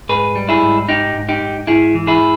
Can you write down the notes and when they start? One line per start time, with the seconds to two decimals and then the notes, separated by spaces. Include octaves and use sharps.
0.09 G#2 G#4 B4
0.35 G3
0.49 E4 G#4
0.62 G#2
0.89 G#2 D#4 G4
1.15 G#2
1.29 D#4 G4
1.41 G#2
1.67 G#2 E4 G#4
1.95 E3
2.07 E4 G#4